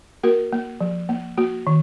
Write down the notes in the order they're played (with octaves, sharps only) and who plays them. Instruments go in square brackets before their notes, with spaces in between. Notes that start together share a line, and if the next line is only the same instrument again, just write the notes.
[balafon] A#3 F#4 A#4
A#3
F3
A#3
A#3 F#4
D#3